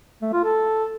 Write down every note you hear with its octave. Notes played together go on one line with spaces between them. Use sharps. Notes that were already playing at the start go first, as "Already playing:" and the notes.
A3
F4
A4